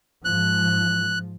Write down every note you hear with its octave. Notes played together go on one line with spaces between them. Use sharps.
G#2 F3 G#3 F#6